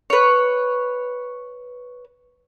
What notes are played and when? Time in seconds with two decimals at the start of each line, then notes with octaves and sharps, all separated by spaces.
0.10 B4 C#5